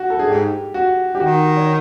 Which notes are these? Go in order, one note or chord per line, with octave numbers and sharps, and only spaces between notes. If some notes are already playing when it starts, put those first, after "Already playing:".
Already playing: F#4
A4
G#4
G#2 G4
F#4
G4
D#3 F#4
C#5